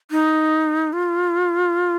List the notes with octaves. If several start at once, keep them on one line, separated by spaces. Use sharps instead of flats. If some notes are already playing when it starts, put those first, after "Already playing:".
D#4
F4